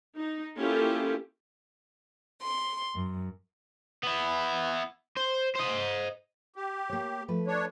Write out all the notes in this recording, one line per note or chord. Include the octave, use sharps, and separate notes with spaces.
D#4
A#3 C#4 E4 F4 G4 A4
C6
F#2
B3 E4
C5
C5 D#5
G4
A#3 C#5
F3 A3 B4
D4 C#5